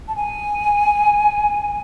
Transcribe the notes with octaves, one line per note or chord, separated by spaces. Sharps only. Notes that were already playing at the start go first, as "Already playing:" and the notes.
A5
G#5